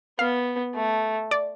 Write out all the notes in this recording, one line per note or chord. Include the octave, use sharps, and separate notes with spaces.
B3 F5
A3
D5